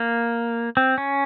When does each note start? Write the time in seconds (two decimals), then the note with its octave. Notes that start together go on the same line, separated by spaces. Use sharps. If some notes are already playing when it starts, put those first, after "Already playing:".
Already playing: A#3
0.77 C4
0.98 C#4